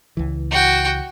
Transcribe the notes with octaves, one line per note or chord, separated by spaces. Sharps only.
C#2 E3
F#4 G5